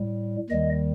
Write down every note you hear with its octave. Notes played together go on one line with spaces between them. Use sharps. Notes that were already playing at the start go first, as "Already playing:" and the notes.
Already playing: A2 G3
D#2 D#3 G3 D#5